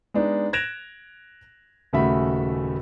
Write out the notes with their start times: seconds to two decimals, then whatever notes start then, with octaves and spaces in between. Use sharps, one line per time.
0.14 G#3 B3 D4 D#4
0.53 F#6 G#6 A#6 D7 E7 F7
1.93 D#1 C#3 A3 F#4 E5 B5